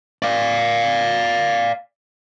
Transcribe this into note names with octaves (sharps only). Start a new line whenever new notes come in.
D5 F5